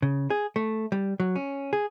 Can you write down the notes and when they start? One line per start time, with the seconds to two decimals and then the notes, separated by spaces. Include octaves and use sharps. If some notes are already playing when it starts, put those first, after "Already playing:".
0.02 C#3
0.30 G#4
0.56 A3
0.92 G3
1.20 F#3
1.36 C#4
1.73 G#4